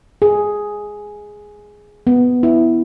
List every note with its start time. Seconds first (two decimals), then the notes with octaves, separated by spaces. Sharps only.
0.22 G#4
2.07 B3
2.43 E4